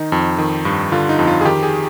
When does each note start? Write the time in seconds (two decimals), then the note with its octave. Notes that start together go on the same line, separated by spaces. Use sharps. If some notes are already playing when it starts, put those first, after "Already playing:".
Already playing: D#3 D#4
0.12 F2
0.38 D#3
0.65 G2
0.92 D3 F4
1.09 D#4
1.19 F2
1.27 F4
1.41 G#4
1.45 D#3 G4
1.63 G#4